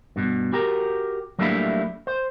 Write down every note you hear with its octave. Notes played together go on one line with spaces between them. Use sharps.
G2 B2
F#4 G4 A#4
F#3 G3 A3 A#3 D4 E4
C5